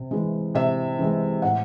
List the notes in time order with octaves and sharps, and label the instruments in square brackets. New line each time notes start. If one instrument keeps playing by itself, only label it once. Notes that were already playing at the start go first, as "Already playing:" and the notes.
Already playing: [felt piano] C3
E3 G#3
C3 E5
E3 G#3
A2 F#5